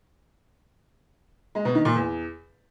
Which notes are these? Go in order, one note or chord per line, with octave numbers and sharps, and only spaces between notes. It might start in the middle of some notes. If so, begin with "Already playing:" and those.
G#3
B2
D#3
A#2
E2